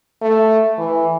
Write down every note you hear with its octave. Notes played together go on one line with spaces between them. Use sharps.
A3
E3